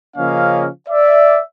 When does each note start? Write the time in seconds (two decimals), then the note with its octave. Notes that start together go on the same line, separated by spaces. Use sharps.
0.17 C#3 F3 A#3 C#4 D#5 F5
0.89 D5 E5